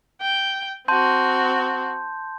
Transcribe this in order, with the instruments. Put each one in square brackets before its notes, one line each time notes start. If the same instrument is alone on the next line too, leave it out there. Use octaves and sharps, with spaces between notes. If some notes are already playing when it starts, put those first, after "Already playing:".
[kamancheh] G5
[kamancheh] C4 F#4 [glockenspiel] A5 C6 G6